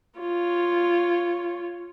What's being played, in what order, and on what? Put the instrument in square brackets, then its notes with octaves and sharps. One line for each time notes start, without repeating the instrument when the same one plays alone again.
[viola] F4 C#5